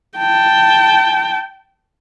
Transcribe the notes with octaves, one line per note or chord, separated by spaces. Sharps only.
G5 A5